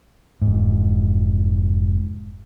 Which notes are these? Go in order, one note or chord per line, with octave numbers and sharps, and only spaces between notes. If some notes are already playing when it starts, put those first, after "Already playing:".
F1 G#2